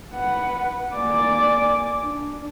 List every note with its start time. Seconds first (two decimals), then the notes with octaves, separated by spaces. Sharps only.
0.14 B4 F#5
0.95 A#3 D5 G#5 D6
2.03 D4